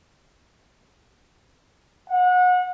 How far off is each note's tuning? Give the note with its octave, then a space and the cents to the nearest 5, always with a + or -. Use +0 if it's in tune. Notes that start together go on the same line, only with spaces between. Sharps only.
F#5 -30